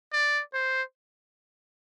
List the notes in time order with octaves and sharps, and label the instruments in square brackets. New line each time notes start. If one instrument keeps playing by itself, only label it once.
[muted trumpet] D5
C5